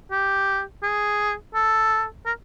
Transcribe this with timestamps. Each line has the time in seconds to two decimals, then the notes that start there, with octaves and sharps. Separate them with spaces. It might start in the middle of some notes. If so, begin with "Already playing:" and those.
0.11 G4
0.83 G#4
1.55 A4
2.26 A#4